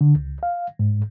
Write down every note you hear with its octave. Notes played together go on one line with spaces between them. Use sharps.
D3
C#2
F5
G#2